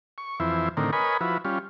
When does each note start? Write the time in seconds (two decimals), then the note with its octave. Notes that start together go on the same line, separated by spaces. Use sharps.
0.18 C#6
0.40 F2 E3 E4 C5
0.77 A2 D3 D#3 C4 A#4
0.93 A#4 B4 C#5 D#5 G#5 B5
1.21 F3 E4 F#4 B4
1.45 G3 C#4 F4